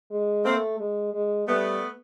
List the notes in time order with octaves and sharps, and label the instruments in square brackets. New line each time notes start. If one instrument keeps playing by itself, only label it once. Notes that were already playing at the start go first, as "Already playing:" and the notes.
[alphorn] G#3
[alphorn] A3 [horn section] A#3 C4
[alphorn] G#3
G#3
[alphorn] G3 [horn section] A3 B3